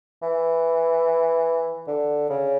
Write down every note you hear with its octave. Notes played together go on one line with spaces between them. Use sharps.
E3
D3
C#3